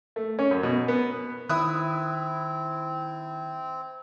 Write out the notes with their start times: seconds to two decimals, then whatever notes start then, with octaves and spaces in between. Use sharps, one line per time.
0.16 A3
0.39 C#4
0.51 F#2
0.63 B2
0.88 B3
1.49 D#3 C4 E4 E5 D#6 F#6